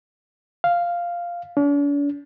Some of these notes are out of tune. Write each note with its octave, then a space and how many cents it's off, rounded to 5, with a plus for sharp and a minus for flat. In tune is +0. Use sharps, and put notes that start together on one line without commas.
F5 -5
D4 -45